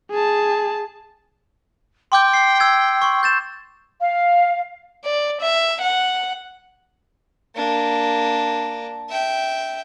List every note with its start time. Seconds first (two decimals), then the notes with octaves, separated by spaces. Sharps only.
0.11 G#4 A5
2.12 G5 C6 D6 G6
2.34 C7
2.60 E6 G#6
3.02 C6 C#6
3.23 G6 A6 E7
4.01 F5
5.04 D5
5.41 E5
5.81 F#5
7.56 A#3 D4
9.09 E5 G5